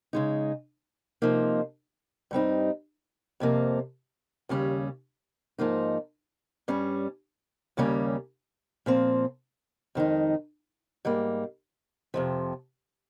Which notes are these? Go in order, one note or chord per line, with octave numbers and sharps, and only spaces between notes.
C#3 G#3 D#4
C3 F3 A#3 D#4
G2 G3 C4 D#4
F2 C3 F3 A#3
D#2 C#3 G3 C#4
G#2 F3 A#3 D#4
G2 G3 C#4
D#2 C#3 G3 A#3 C#4
A#2 F3 C4
F2 D#3 G#3 D#4
G#2 G3 A#3
F2 C3 F3